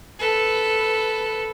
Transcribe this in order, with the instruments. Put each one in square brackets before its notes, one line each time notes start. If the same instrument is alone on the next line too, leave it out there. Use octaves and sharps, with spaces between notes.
[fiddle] A4 B4